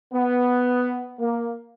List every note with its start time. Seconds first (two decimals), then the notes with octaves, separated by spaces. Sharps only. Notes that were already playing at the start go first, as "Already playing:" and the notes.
0.12 B3
1.18 A#3